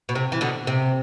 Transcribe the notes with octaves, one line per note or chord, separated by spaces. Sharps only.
B2
C3
E3
B2 D3
C3